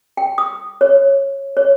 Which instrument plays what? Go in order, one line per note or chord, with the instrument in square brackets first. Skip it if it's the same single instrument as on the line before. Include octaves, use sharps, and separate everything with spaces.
[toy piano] G5
D#6
C#5
C#5